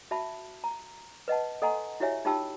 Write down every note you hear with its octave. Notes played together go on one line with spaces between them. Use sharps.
F#4 E5 A5 B5
A#5
B4 D#5 F#5 A5
A4 D#5 F#5 G#5 A#5 C6
E4 F#4 G4 C#5 E5 G#5
D#4 F4 G4 G5 A5 E6